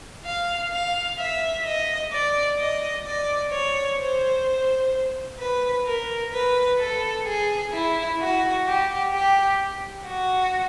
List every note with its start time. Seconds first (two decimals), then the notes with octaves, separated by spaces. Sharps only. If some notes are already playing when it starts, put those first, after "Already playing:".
0.24 F5
0.72 F5
1.18 E5
1.65 D#5
2.12 D5
2.58 D#5
3.05 D5
3.52 C#5
3.99 C5
5.39 B4
5.86 A#4
6.32 B4
6.79 A4
7.26 G#4
7.72 E4
8.20 F#4
8.66 G4
9.13 G4
10.06 F#4